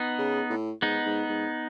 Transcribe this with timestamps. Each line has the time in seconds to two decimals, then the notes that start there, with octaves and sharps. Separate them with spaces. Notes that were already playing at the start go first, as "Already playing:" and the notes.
Already playing: B3 D#4
0.19 C#3
0.50 A2
0.82 G#2 B3 D#4
1.05 G#2
1.29 G#2